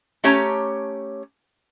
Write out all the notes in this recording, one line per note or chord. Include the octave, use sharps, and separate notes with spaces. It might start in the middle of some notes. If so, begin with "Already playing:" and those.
A3 C#4 G4 C#5 A5 A#5